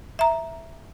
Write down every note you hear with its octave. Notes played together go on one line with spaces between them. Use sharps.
E5 A#5